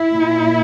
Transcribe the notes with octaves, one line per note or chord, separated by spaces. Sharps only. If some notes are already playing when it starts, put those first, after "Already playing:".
Already playing: E4
A#2